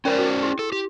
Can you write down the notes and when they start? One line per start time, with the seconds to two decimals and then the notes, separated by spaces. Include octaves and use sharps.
0.05 C#4 A#4 C5 D5 G5
0.19 F#4
0.43 E4
0.59 A4
0.72 G4